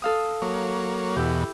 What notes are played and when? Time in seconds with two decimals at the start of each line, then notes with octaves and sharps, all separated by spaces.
0.02 A4 F5 D#6
0.42 F#3 A#3 C#5
1.17 E2 B2 E4 G4